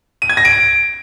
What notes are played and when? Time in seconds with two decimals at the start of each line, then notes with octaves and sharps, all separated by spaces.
0.22 D#7
0.30 G#6
0.37 A#6
0.45 D7